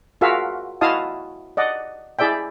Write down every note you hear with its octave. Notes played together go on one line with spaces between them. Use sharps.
F4 F#4 G#4 A#4 E5 F5
E4 F#4 D#5 F5 A5 D#6
D5 D#5 F#5
E4 G#4 D5 E5 G5